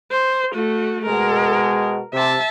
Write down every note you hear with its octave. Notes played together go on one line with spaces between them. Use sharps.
C5
A3 F#4
B2 G#3 A#4
C3 E5 A5